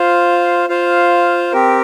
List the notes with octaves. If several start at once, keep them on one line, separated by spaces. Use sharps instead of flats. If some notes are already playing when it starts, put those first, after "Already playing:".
Already playing: F4 C5 F5
F4 C5 F5
C4 G4 A#4